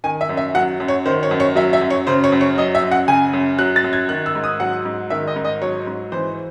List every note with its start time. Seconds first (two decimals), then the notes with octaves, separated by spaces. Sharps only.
0.04 D#3 G#5
0.21 E5
0.29 F#2
0.37 E5
0.55 F#3 F#5
0.80 F#2
0.88 C#5
1.06 D#3 C5
1.23 C#5
1.31 F#2
1.40 C#5
1.56 F#3 E5
1.73 E5
1.81 F#2
1.90 C#5
2.07 C#3 C5
2.24 C#5
2.32 F#2
2.41 C#5
2.58 F#3 D#5
2.75 E5
2.82 F#2
2.92 F#5
3.08 C#3 G#5
3.33 F#2
3.59 F#3 F#6
3.76 A6
3.84 F#2
3.93 G#6
4.09 D#3 F#6
4.26 E6
4.35 G#2
4.44 D#6
4.60 F#3 F#5
4.85 G#2
5.10 D#3 E5
5.27 D#5
5.36 G#2
5.45 D#5
5.62 F#3 C#5
5.87 G#2
6.12 E3 C5